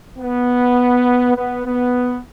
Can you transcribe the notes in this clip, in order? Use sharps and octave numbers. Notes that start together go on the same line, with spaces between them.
B3
B3
B3